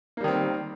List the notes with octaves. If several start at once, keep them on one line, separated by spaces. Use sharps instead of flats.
D#3 G3 A#3 C4